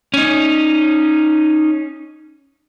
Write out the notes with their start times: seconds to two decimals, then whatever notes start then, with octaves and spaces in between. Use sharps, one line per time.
0.14 C#4 D#4